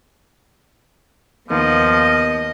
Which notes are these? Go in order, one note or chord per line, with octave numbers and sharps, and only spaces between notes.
D#2 D#3 F3 A#3 B3 D#5